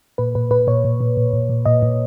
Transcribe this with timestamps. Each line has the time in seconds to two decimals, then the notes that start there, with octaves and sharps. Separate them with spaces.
0.18 A#2 B4
0.35 A#2 B4
0.51 A#2 B4
0.67 A#2 C#5
0.84 A#2
1.00 A#2
1.17 A#2
1.33 A#2
1.49 A#2
1.65 A#2 D#5
1.82 A#2